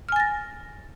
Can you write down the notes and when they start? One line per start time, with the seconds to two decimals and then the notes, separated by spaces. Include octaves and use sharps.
0.09 F6
0.12 G#5
0.16 A6
0.20 A#6